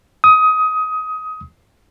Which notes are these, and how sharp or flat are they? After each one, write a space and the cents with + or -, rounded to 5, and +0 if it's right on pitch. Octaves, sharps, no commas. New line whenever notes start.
D#6 +20